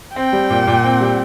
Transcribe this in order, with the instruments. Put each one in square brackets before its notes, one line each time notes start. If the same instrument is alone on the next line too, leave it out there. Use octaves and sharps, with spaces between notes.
[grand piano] C4 [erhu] G5
[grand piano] G3
A#2
A#2
C4
G3